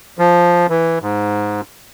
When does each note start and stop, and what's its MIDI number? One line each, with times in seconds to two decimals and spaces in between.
0.19 0.67 53
0.69 0.99 52
1.02 1.61 44